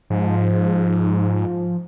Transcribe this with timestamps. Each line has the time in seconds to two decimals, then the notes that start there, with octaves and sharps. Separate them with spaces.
0.10 G#2 F3